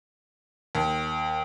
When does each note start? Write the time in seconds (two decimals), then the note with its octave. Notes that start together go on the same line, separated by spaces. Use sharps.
0.75 D#2